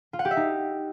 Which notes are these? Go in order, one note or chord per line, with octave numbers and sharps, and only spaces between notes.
F4
F#5
G4
E5
D#4